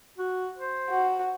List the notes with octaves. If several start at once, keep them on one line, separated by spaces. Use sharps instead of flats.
F#4
C5
F#4